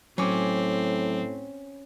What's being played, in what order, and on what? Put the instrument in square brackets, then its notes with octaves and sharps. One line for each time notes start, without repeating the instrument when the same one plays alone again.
[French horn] A2 [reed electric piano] F#3 D6 [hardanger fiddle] C4 [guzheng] C#4 G#5